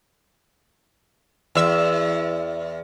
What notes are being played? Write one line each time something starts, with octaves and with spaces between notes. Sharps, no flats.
E2 E5